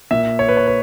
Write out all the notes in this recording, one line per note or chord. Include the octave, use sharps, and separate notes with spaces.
A#2 E5
C#5
B4
C#5
B4